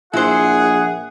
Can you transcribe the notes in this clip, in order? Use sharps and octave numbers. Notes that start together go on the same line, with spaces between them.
A#1 E4 G#4 C5 F#5